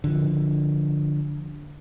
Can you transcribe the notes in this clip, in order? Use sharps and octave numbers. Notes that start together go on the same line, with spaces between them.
D3 F3